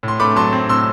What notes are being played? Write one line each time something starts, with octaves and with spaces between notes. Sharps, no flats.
A2
C6
A3 B5 D6
F#3 A5 C6
C4
A2 C6 E6